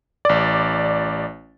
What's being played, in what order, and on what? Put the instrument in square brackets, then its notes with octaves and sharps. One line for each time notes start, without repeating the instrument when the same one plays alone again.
[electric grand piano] A1 D5